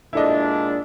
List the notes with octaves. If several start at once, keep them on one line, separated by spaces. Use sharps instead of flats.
A#2 G#3 D4 E4 A4 D#5